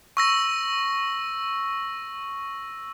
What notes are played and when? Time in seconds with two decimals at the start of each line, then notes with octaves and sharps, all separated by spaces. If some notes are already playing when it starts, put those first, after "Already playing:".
0.17 C#6 E6 A#6